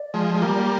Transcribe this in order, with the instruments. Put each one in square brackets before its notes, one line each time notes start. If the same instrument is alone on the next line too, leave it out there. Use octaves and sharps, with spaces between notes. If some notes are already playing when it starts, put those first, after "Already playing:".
Already playing: [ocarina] D5
[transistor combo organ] F3 G#3
G#3
G3 A#3